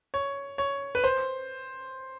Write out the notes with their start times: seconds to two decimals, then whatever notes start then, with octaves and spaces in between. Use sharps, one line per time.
0.14 C#5
0.58 C#5
0.95 B4
1.04 C5